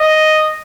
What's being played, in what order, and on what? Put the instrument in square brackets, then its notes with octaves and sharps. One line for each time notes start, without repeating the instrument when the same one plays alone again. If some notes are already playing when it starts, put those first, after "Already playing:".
Already playing: [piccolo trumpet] D#5